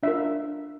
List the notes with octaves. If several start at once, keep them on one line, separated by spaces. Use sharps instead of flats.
D4 F4 A#4 E5